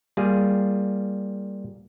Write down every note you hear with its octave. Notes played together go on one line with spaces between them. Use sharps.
G3 A#3 F4 G#4